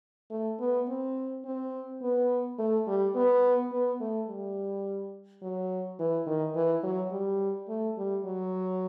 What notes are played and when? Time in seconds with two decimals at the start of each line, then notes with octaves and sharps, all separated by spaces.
0.31 A3
0.60 B3
0.88 C4
1.45 C4
2.02 B3
2.58 A3
2.87 G3
3.15 B3
3.72 B3
4.00 A3
4.28 G3
5.42 F#3
5.99 E3
6.26 D#3
6.55 E3
6.83 F#3
7.12 G3
7.69 A3
7.98 G3
8.25 F#3